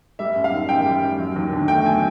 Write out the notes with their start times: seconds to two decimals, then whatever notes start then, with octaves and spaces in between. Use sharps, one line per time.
0.19 G3 E5
0.36 F#2
0.44 F5
0.52 D#3
0.69 F#2 G5
0.85 G3
1.02 F#2
1.19 F#3
1.36 D#2
1.52 D3
1.68 A3 G5
1.85 F#3 G#5